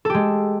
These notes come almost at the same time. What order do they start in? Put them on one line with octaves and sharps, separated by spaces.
A4 G4 G#3